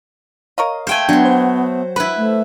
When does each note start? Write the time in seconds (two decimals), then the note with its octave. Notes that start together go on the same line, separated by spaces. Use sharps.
0.58 A#4 C#5 D#5 F5
0.87 A3 A#3 C5 G5 G#5
1.09 F#3 B3 D4 C6
1.25 C5
1.96 E4 B4 B5
2.17 A3